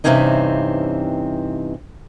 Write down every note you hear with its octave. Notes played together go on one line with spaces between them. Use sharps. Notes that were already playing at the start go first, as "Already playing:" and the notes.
G2 C3 E3 C4 C#4 D#4